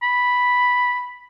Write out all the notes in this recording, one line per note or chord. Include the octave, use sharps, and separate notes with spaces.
B5